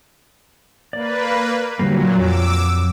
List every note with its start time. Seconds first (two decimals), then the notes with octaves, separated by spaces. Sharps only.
0.93 A#3 B4 D5
1.79 A#2 D3 F#3 G3 A#3
2.18 F2 D6 E6